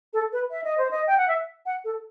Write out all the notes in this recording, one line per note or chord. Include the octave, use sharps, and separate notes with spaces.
A4
B4
E5
D#5
C5
D#5
G5
F#5
E5
F#5
A4